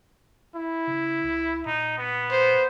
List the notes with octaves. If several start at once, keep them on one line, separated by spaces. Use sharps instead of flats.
E4
C#3
C#2
A#2 D#4
B3
C5